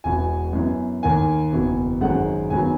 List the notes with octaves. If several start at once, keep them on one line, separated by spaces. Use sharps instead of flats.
E1 E2 B2 G#5
F#2 E3 B3
D#2 D#3 A#3 G#5
F#1 E2 B2
G#1 F#2 D#3 G#3 F#5
D#2 D#3 F#3 B3 G#5